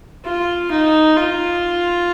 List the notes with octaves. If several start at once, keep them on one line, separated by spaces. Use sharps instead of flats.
F4
D#4
F4